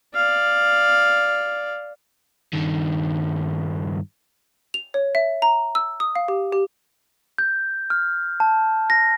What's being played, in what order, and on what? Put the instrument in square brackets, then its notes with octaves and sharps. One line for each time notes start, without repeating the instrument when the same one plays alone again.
[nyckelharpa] D5 F5
[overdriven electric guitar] G2 D#3
[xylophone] F7
C#5
E5
A#5
E6
D#6
F5
G4
G4
[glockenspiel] G6
F6
A5
A#6